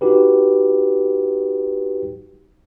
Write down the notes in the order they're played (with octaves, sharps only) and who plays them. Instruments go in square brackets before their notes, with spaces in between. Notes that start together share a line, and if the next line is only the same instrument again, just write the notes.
[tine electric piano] D#4 F#4 G4 B4